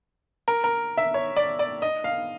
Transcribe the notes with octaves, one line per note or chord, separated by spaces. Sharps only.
A#4
A#4
E5
C#5
D5
D5
D#5
F5